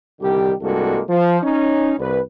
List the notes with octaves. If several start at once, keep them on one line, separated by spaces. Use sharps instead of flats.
C2 D3 D#3 G3 G4
C2 G2 G#3 A#3 F#4 A4
F3
C#4 D#4
C2 B4